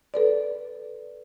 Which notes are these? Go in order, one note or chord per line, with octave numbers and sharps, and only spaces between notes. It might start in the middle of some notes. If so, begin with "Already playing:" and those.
A4 B4 D5